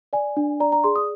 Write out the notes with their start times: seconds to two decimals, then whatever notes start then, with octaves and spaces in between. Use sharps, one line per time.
0.13 D5 G#5
0.37 D4
0.60 D5 A#5
0.72 A#5
0.84 G#4 C6
0.96 D#6